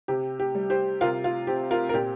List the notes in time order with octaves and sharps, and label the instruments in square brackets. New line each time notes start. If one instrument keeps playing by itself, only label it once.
[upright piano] C3 G4
G4
G3
G4 C5
C3 F4 A#4
F4
C4 G4
F4 A#4
A#4
A#2 G4